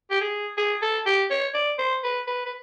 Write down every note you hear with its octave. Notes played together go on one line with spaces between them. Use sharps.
G4
G#4
G#4
A4
G4
C#5
D5
C5
B4
B4
B4